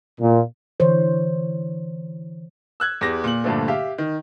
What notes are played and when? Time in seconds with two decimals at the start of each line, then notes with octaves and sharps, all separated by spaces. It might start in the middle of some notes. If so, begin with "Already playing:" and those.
0.20 A#2
0.80 D3 E3 C5 C#5
2.80 E6 F#6 G#6
3.01 E2 G4 A#6
3.24 A#2 F#7
3.44 G2 A#2 D3 F3 A3
3.68 G4 E5 F5
3.98 D#3